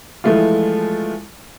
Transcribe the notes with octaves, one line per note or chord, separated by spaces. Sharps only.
E3 F3 G#3 A3 E4 F4